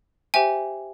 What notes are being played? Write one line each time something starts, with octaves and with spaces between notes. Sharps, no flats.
G4 C5 E5 G5 G#5